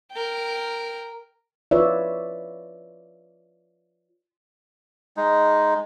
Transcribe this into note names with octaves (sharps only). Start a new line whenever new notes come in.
A#4 G5
F4 B4 C#5 D5 E5
G#3 D#4